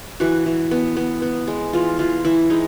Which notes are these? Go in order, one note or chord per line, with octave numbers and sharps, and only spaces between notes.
E3 F#4
E3
B3
B3
B3
G#3
E3 F4
E3 F4
E3 E4
G#3 D#4